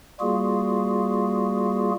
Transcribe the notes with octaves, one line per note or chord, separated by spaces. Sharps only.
G3 A#3 F4 F#4 G#4